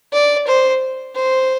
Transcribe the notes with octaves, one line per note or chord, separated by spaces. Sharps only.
D5
C5
C5